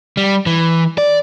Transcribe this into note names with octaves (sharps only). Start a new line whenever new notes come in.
G3
E3
D5